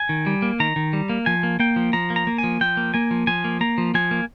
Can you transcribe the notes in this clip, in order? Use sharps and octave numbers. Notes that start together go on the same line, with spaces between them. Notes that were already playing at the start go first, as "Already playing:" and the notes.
Already playing: G#5
D#3
G3
A#3
D#3 A#5
D#3
G3
A#3
F3 G#5
A#3
A#3 G5
F3
F3 A#5
A#3
A#5
A#3
G#5
F3
F3 G5
A#3
A#3 G#5
F3
F3 G#5
A#3
A#3 A#5
F3
F3 G#5
A#3